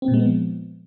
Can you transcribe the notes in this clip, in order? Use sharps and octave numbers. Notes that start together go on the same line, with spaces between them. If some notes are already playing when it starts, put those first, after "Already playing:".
C4
A#2
G#3
B3
F3